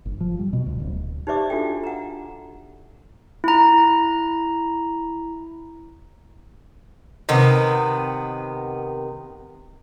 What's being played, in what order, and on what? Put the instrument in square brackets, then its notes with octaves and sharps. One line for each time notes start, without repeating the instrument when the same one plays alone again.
[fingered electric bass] G1
F3
G3
B2
D2
D1
[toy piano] D#4 G4 C5 D5 E5 D6
D4 F4 F#4 A4 G5
F#5 A#5
[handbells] E4 A#5
[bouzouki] C3 D#3 B3